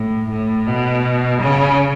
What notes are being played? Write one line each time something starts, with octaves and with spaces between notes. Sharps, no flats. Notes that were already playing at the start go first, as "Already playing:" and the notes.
Already playing: A2
A2
B2
C#3